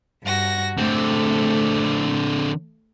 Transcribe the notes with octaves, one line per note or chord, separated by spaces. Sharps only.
G2 F#4 A#6
D3 A3 C4